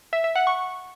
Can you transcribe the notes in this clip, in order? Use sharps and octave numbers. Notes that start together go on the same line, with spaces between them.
E5
E5
F#5
C#6